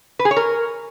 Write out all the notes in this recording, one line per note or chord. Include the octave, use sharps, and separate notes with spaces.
B4
G#4
C#5
A#4